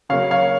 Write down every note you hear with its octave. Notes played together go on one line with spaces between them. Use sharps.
C#3 F#3 A#3 C#5 F5
C#5 F5